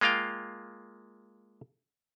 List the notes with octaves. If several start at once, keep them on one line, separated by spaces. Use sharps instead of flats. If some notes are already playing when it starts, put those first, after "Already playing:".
G#3 A#3 F4 F5 G5